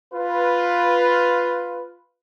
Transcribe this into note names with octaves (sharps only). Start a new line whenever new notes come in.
F4 B4